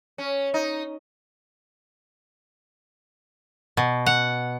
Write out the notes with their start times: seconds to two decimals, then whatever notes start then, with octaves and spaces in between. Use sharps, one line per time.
0.18 C#4
0.54 D#4
3.77 B2
4.06 F#5